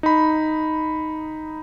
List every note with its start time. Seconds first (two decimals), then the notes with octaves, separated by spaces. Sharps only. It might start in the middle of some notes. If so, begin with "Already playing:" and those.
0.03 D#4 B5